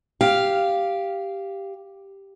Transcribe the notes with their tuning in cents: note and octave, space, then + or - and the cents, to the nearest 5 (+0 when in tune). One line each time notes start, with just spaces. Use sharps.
G4 +0 F5 -10